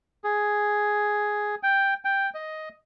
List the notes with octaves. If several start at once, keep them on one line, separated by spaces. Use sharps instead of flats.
G#4
G5
G5
D#5